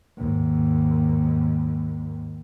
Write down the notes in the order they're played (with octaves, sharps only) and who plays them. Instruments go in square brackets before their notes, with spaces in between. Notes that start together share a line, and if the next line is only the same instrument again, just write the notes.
[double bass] D#2 G#2